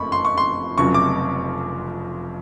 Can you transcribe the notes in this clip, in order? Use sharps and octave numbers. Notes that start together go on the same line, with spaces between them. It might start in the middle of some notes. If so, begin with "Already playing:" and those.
Already playing: F#1 F2 C#3 F3 A3 B5 C#6
C6
C#6
C6
F1 F2 C#3 F#3 C#6
D6